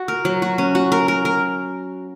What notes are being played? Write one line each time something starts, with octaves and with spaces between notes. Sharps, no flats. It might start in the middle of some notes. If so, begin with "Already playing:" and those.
Already playing: F#4
A#4
F#3
F#4
C#4
F#4
A#4
A#4
A#4